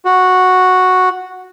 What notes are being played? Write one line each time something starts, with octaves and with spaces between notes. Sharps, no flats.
F#4